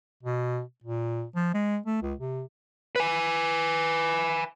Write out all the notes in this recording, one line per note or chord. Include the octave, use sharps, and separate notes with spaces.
B2
A#2
F3
G#3
A3
C#2
C3
B4 G#5